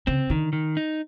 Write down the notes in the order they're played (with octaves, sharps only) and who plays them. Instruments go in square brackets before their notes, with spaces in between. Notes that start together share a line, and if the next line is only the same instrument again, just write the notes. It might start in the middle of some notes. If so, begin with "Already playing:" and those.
[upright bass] C#3 [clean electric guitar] C4
[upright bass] D3 [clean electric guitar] D#3
[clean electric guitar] D#3
D#4